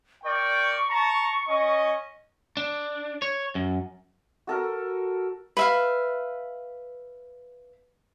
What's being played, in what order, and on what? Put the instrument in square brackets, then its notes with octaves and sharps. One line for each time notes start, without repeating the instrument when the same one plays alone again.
[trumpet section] A#4 D5 G5 [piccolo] C#6
[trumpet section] A5 A#5
C#4 D#5
[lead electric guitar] D4
C#5
F#2
[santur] F#4 A4 A#4
[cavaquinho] B4 E5 F5